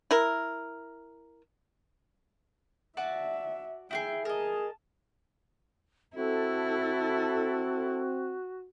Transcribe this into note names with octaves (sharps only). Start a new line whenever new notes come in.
E4 A#4
F#4 D5 E5 A5
E4 F#4 G#4 G5
G#4 A#4 D#5 A5
C4 E4 F#4 A4